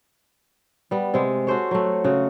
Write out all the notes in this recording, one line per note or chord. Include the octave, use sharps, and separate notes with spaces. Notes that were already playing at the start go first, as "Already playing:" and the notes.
G3 B3
C3 G#3
F#4 A4 C5 C#5
F#3 A3
C#3 F#4